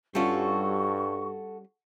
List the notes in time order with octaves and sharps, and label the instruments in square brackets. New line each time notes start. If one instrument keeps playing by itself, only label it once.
[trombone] G2 [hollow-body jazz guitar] G3 C#4 F4 [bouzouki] F#4 A4 [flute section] C#6